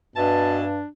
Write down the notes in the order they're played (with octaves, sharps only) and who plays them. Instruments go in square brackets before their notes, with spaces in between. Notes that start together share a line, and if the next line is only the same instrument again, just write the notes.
[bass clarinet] G2 [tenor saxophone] B2 [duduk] D4 [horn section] E5 G#5 A5